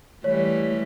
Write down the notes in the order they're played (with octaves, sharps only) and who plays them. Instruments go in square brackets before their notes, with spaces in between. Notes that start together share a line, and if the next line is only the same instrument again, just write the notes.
[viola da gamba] E3 G3 A3 [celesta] C#5